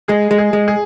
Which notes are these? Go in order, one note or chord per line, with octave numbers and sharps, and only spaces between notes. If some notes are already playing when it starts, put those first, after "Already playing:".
G#3 G#4
G#3
G#4
G#3
G#4